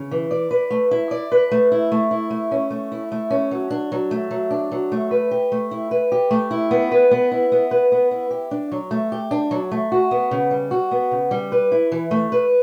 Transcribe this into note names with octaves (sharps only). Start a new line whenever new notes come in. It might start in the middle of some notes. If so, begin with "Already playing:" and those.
Already playing: C#3
E3
D5
B4
A3
E4
D5
B4
A3
E4
A3
E4
A3
C#4
A3
E4
A3
C#4
F#3
D4
F#3
A3
F#3
D4
F#3
A3
B4
G4
A3
E4
B4
G4
A3
E4
B3
B4
B3
E4
B3
B4
B3
E4
G4
D4
F#3
A3
G4
D4
F#3
A3
F#4
B3
C#3
G3
F#4
B3
C#3
G3
B4
E4
E3
A3
B4